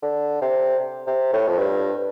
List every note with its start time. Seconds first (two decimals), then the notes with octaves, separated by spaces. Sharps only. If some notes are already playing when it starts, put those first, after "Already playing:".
0.03 D3
0.41 C3
1.07 C3
1.33 A2
1.48 F2
1.58 G2